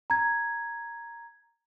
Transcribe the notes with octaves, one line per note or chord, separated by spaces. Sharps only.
A#5 G#6